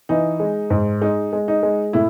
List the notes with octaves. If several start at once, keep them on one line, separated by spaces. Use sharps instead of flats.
E3 D#4
G#3
G#2
G#3 D#4
G#3
D#4
G#3
A2 E4